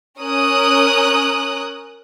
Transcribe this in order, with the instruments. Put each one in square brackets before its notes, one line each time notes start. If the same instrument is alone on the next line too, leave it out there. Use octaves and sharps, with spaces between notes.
[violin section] C#4 A#4 D#6 F#6